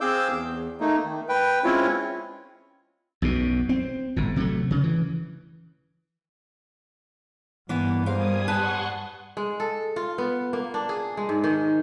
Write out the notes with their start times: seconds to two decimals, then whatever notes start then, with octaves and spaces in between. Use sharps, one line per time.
0.01 C4 G#4 F5 D6 E6 G6
0.29 E2
0.80 A3 A#3 D#4
1.04 D#3
1.29 B4 G5
1.64 G#3 C4 C#4 E4 F4 C#5
3.22 B1 F#2 B2
3.69 C4
4.16 G1 A2
4.36 C3 F#3 A3
4.71 C#3
4.83 E3
7.69 G2 E3 A#3 B3
8.06 G3 A#4 C5 F5 G#5 D#6
8.48 B4 F#5 A5 C6 C#6
9.37 G#3
9.60 A4
9.96 F4
10.18 B3
10.53 A#3
10.74 D4
10.89 G#4
11.17 G#3
11.29 G#2
11.44 D#3